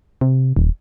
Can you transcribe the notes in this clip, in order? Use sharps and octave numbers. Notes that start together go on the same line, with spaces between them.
C3
D#1